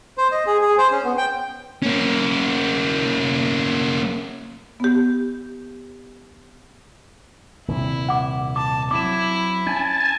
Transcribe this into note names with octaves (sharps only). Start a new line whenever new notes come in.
C5
D#5
G#4
G#4
C5
C#4
B3
G5
A#3 C#4
B3 G4
D#1 C3 E4
F#5 D6
A5 D6
F#3 C4 E4 D6 E7
C#4 G#5 A5